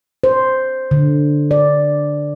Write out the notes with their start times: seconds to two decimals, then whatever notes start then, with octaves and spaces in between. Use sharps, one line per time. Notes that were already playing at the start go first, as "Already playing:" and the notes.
0.24 C5
0.91 D3
1.51 D5